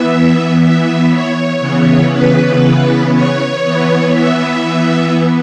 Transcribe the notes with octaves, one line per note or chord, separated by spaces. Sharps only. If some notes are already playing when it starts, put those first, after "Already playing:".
Already playing: E3 B3 E5
E5
C#5
C#3 E3 B3
B4
C#5
E3 B3
E5